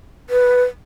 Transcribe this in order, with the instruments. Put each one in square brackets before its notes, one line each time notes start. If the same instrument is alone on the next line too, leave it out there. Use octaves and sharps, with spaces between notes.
[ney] B4